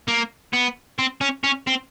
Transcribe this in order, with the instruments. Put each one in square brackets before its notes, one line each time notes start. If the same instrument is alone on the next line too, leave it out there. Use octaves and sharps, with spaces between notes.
[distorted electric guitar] A#3
B3
C4
C#4
C#4
C4